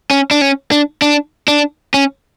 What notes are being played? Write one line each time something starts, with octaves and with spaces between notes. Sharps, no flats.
C#4
D4
C#4
D4
D4
D4
C#4